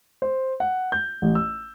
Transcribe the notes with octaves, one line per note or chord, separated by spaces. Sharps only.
C5
F#5
G6
A1
E6